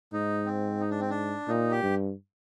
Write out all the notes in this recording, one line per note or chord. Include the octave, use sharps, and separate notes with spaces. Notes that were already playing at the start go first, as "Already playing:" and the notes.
G#2 D#4
C4
D#4
D4
C4
D4
A#2 D#4
G4
G2